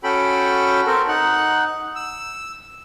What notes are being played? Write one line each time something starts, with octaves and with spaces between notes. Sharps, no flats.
C#4 F#4 A4 G5 B5
C4 A4 A#4
D#4 F#5
E6